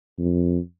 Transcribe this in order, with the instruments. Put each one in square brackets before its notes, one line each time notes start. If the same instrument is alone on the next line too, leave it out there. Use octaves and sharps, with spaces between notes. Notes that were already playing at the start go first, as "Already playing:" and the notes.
[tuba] F2